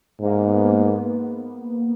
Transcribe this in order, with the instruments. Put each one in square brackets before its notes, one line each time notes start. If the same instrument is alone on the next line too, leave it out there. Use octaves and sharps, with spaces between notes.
[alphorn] G#2 [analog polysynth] A#3
[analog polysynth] B3
A#3